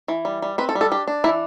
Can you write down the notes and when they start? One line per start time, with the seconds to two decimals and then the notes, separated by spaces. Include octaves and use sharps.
0.08 E3
0.25 G3
0.42 G3
0.58 C4 B4
0.69 A4
0.75 G3
0.81 A4
0.92 D4 G4
1.08 D4
1.24 E3 E4